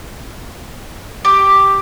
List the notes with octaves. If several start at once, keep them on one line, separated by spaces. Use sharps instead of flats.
G4